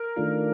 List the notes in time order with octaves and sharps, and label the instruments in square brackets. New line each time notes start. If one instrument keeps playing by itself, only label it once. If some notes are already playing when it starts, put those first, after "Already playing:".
Already playing: [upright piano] A#4
[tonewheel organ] D#3 A3 D4 F4